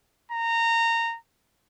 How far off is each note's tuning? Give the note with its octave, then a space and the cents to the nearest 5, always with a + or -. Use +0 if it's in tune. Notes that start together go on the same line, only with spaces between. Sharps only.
A#5 -20